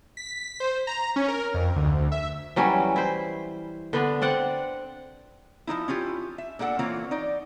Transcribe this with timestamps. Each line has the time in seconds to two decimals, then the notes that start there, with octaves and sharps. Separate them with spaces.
0.17 B6
0.60 C5
0.87 A#5
1.16 C#4
1.28 A#4
1.54 F2
1.76 D2
2.12 E5
2.56 E3 F#3 G3 C#4
2.96 E4 C5
3.93 D3 B3 D4
4.22 C4 D5 F#5
5.67 F3 G#3 D#4 E4
5.88 C#4 E4 F4 G4
6.38 E5
6.59 A#2 D4 A4 F#5
6.79 E3 A#3 C4 F4 C#5
7.11 D#4 D5